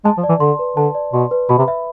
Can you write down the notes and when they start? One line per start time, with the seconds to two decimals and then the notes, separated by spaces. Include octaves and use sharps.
0.05 G#3 A5
0.17 F3
0.23 D5
0.29 E3
0.40 D3 C6
0.59 B4
0.77 D3 A5
0.95 D5
1.13 B2 C6
1.31 B4
1.49 B2 B5
1.58 C3
1.68 E5